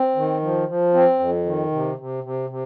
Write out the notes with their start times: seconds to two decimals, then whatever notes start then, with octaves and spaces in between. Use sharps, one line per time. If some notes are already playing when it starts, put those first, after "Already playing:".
Already playing: C4
0.16 D#3
0.42 F3
0.68 F3
0.94 C4
1.19 F2
1.46 D#3
1.72 C3
1.98 C3
2.24 C3
2.50 C3